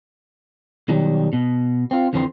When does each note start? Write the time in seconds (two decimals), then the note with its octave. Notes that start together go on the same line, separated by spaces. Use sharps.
0.88 B2 D#3 F#3 G3
1.33 B2
1.91 C4 F4
2.13 F2 D3 E3 C4 A4 C5